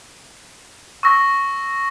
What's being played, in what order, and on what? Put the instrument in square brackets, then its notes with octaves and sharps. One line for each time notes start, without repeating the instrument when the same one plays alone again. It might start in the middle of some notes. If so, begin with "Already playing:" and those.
[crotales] C#6 E6 A#6